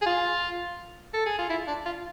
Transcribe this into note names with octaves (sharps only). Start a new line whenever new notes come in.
G#4
F4
A4
G#4
F4
E4
D4
F4